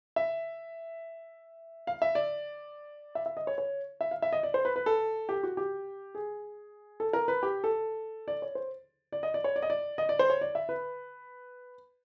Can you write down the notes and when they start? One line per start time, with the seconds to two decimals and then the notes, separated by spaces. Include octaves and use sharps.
0.16 E5
1.87 F5
2.02 E5
2.15 D5
3.15 E5
3.26 E5
3.37 D#5
3.47 C#5
3.58 C#5
4.01 E5
4.11 F5
4.22 E5
4.33 D#5
4.43 D5
4.54 C5
4.65 B4
4.76 B4
4.86 A4
5.29 G4
5.43 F#4
5.57 G4
6.15 G#4
7.00 A4
7.13 A#4
7.28 B4
7.43 G4
7.64 A4
8.28 D5
8.42 C#5
8.55 C5
9.12 D5
9.23 D#5
9.34 D5
9.44 C#5
9.56 D5
9.62 D#5
9.70 D5
9.98 D#5
10.09 D5
10.19 C5
10.30 C#5
10.41 D5
10.55 E5
10.69 B4